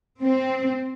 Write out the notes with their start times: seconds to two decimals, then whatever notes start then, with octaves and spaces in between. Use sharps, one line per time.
0.22 C4